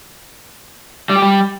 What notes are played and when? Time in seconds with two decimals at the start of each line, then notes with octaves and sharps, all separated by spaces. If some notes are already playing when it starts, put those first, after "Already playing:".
1.09 G3
1.16 G4
1.22 G3